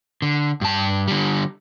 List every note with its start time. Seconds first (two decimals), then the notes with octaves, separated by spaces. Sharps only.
0.22 D3
0.61 G2 A5
1.08 D3 G3